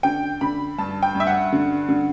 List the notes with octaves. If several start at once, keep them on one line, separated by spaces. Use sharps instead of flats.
D3 G5
D3 B5
G2 A5
G5
G2
E5
F#5
D3
D3